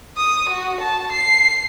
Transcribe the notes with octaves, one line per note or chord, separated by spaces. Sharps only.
D#6
F#4
A5
C7